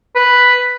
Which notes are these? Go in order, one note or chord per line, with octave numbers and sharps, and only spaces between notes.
B4